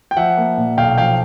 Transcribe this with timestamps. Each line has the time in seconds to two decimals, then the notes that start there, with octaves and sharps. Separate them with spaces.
0.11 G5
0.17 F3 E5 F#5
0.37 A#3
0.57 A#2
0.78 B1 F5 G5
0.98 F3 F5 G5